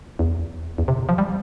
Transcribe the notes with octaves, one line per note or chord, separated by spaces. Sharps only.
E2
E2
C3
F3
G3